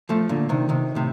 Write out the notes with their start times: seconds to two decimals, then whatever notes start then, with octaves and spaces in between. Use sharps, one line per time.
0.09 F3 A3
0.29 A#2 D3
0.49 C3 D#3
0.69 C3 D#3
0.95 A2 C3